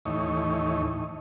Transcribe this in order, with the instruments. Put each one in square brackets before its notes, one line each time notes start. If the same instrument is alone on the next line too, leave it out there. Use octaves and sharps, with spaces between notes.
[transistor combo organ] D#2 A2 E3 D#4 C#5